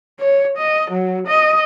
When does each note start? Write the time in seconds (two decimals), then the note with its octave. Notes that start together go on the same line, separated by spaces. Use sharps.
0.20 C#5
0.57 D#5
0.91 F#3
1.27 D#5